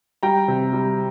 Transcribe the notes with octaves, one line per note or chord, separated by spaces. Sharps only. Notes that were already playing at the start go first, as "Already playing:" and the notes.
G3 G5 A#5
C3
G3